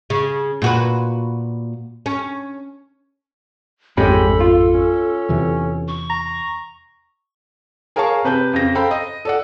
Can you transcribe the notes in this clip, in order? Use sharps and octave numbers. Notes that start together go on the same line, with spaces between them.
C#3
A#2 F#4 B4
C#4
A1 F2 G#2 G#3 C#4 G4 A4 B5
F4
C#4
E2 C3 E3
C#6
A#5
G#4 A#4 C#5 F5 A5 C#6
C3 B4 A5 G6
F2 C#3 A#6
A4 C5 F5 G5 A#5 B5
D#5
A4 D5 F#5